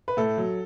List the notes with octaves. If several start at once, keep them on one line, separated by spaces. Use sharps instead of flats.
B4
A2 A4
F#3